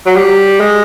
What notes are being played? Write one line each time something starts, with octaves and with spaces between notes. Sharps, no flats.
F#3
G3
G#3